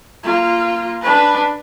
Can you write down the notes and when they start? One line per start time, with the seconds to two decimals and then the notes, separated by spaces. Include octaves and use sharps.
0.23 A#3 F4
1.02 D4 B4